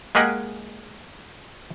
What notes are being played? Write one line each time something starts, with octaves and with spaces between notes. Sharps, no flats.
G#3 A#3 G4 G#4 D#5 F#5